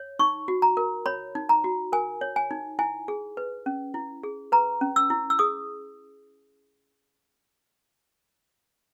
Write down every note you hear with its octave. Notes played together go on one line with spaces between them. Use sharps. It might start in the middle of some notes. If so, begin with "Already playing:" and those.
Already playing: C#5
D#4 C#6
F#4
A#5
A#4
C#5 B5
D#4
A#5
F#4
A#4 G#5
C#5
G#5
D#4
E4 G#5
G#4
B4
C#4
E4
G#4
B4 A#5
C#4
E6
E4
E6
G#4 D#6